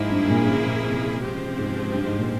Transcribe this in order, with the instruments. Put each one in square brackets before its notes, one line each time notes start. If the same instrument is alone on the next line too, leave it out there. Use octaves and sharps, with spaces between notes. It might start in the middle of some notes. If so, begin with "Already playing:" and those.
Already playing: [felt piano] G#2 [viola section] F3 A#3 E4 G#4
[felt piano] G2
A#2
C#3
A#2
C3
[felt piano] C3 [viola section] F3 G#3 C4 G4 C5
[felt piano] C#3
C3
G#2
G2
G#2
A#2